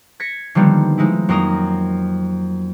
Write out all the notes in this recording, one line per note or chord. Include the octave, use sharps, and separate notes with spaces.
G#6 A#6 B6 C#7
D3 D#3 F3 G3 A#3 B3
F3 G#3 D#4 E4
F2 F#3 A#3 A#4 A#5 D#6